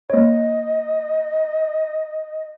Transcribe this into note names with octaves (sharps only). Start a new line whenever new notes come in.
A#3 C#5 D#5